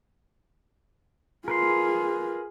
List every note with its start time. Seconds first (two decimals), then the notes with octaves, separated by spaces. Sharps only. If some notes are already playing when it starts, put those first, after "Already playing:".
1.48 F4 G#4 A#4 B4 C6